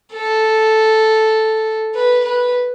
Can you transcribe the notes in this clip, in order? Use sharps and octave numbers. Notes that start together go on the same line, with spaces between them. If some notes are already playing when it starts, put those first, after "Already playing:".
A4
B4
B4